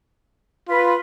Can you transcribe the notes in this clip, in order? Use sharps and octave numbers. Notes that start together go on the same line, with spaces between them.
F4 B4